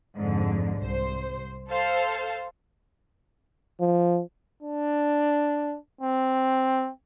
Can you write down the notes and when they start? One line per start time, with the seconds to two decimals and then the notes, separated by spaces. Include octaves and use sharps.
0.17 F2 G#2 D3
0.77 C2 C5
1.69 A4 C5 F5
3.80 F3
4.63 D4
6.01 C4